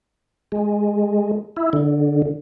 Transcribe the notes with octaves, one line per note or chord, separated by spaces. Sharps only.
G#3
E4
D3